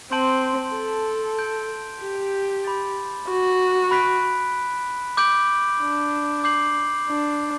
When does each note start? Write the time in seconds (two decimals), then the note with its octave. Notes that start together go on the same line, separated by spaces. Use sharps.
0.12 C4 A5 C6 G6 D7 F#7
0.75 A4
1.39 G6 D7 F#7
2.01 G4
2.65 B5 D6 A6
3.29 F#4
3.91 B5 F#6 B6 D7
5.17 D6 G6 D7 F#7
5.81 D4
6.44 D6 G6 C7 F#7
7.07 D4